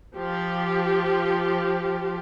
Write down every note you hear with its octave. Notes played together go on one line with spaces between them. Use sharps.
F3 G4